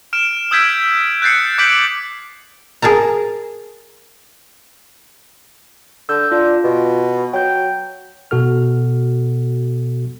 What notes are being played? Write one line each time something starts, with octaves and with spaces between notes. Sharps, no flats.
F6 D7 E7
D#6 E6 G6 G#6 B6 D7
F#6 G6 A6 C7 C#7
D6 G6 B6 D7 F#7
G#4 A#4 A5 A#5
D3 E6 G6
D4 F4
B2
F#3 G5 G6
B2 F#4 A4 F6